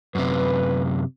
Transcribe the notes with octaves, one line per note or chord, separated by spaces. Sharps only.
F#2 C3 B4